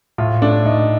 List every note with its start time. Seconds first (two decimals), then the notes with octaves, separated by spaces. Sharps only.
0.18 A2 F4
0.42 A3 D4
0.65 A2 D#4